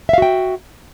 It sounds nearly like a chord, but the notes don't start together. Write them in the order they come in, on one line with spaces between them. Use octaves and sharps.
E5 F5 F#4 G5